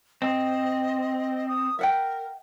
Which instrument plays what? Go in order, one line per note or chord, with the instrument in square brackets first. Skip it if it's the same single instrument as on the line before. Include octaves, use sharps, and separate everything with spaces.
[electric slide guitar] C4 [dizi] D#5
[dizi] D#6
[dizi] A#4 [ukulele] E5 F#5 G5